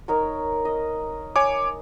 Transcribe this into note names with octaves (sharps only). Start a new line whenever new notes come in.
D#4 A#4 C#5
D#5
C#5 G#5 D6